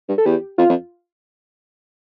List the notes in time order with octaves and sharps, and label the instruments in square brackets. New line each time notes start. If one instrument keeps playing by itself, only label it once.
[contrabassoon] G2
[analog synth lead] A4
[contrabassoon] E2 [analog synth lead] G4
[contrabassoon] F2 [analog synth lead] F4
[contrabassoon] F2